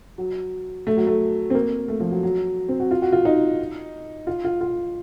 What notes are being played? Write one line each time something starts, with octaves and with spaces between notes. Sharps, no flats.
F#3
A3
F#3
A3
C4
A#3
A3
F3
F#3
F#3
C4
F#4
F4
F#4
F4
D#4
F4
F4
F4